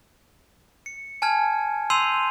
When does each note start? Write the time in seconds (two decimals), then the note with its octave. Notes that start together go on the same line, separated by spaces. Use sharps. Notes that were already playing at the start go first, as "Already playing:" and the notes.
0.86 C#7
1.22 G#5 A5 F6 G#6
1.90 C6 E6 G6 C7 D#7 F7